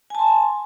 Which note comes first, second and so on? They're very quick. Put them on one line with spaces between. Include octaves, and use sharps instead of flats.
G#5 A5 C6